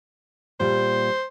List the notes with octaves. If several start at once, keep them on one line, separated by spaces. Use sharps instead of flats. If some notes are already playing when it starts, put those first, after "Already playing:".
A#2 G3 C5